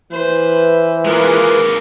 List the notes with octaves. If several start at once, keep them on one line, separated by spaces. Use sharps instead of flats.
E3 B4 C5
G#3 A#3 F4 G#4 A#4 B4